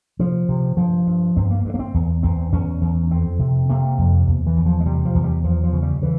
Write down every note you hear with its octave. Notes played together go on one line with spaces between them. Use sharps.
C3 F3
C3
G2 F3
G2
G2 C4
A#3
G2
A#3
C4
E2
E2 C4
E2 C#4
E2
F2 C4
C3
C3 A#3
F2
E2
E3
E2
F3
G#3
C3 G3
F3
E2
G3
E2 F3
F3
C#3
G3
C#3 E3